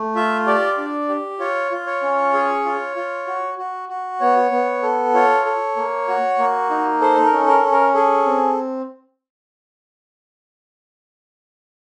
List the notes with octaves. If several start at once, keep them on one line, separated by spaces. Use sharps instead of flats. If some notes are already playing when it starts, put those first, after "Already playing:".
Already playing: A3
F4 E5
G4 D5
D4
G4
F4 C#5
F4
C#5
C#4
G#4
F4
F4
F#4
F#4
F#4
B3 C#5
B3
A4
F4 C#5
A4
A#3
F#4
A#3
D#4
A4 C5
A#4
C#4
A#4
C#4
A#4
G#4 A4
C4